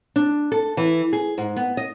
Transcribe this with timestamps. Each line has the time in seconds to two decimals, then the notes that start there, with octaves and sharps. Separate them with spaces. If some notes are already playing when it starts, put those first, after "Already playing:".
0.16 D4
0.52 A4
0.77 E3
1.13 G#4
1.38 G#2
1.56 B3
1.77 D#5